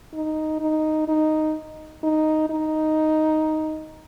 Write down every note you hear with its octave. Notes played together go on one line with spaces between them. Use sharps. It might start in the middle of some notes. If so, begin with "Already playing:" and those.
D#4
D#4
D#4
D#4
D#4